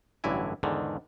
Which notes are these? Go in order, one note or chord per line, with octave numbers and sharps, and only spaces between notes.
A1 G2 D3 F#3 E4 G#5
E2 G#2 D3 D#3